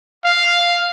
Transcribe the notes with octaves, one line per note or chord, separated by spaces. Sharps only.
F5